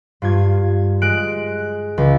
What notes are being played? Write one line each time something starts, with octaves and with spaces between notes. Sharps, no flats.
G2 F4 G#6
G#3 F#6 D7
C#2